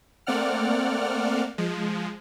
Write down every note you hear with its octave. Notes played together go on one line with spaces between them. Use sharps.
A3 A#3 C4 D5 F#5 F6
F3 G#3